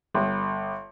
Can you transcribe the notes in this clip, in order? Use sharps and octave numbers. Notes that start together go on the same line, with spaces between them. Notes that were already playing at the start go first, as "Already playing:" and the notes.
G1